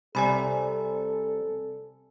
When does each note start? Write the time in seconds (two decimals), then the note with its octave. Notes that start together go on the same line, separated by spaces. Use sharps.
0.15 C2 C3 A4 D5 G#5 B5